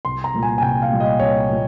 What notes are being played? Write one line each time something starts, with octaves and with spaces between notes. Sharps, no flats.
C2 C6
A#5
A#2 G3
G#5
G#5
C2 G5
F5
A#2 G3
D#5
C2 C#5
A#2 G3